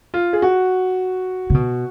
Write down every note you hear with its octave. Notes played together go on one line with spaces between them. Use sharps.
F4
G#4
F#4
C#3
B2